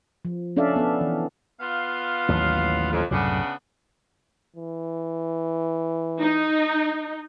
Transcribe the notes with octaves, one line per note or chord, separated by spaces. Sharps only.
F3
C#4 D4 A4 D5 E5 F5
B3 A4
E3
B3 F4 F5
A1 D#2 F#3
F2
C2 F#2 A2 C#3 B3 D4
E3
D#4